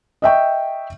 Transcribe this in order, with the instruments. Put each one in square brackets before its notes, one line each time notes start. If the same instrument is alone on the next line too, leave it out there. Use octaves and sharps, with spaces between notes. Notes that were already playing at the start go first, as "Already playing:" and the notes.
[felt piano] D#5 E5 G5 C#6